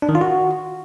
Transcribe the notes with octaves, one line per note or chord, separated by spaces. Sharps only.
D4
D#3
F4
F#4